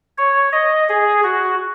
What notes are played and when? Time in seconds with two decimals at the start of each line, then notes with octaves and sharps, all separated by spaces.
0.18 C#5
0.53 D#5
0.89 G#4
1.23 F#4